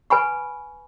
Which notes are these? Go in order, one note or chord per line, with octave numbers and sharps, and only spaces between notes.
B4 G#5 B5 C#6